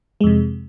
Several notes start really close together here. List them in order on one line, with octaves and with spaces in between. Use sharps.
G#3 F2 C3